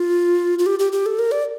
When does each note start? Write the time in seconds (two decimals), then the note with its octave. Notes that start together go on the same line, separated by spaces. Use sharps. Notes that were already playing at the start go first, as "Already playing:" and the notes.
Already playing: F4
0.59 F4
0.66 G4
0.79 G4
0.92 G4
1.06 A4
1.19 A#4
1.32 D5